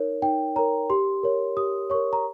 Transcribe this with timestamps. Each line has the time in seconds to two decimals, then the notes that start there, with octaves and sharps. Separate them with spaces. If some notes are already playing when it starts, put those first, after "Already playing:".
Already playing: D#4 A#4 C#5
0.22 D#4 G5
0.56 A#4 C#5 A#5
0.90 G4 C6
1.23 A#4 C#5
1.57 G4 D#6
1.90 A#4 C#5 C#6
2.13 A#5